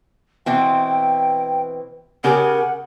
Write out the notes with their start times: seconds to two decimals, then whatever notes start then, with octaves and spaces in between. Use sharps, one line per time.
0.46 B2 E3 C4 G5
2.24 C#3 G4 G#4 A#4 F#5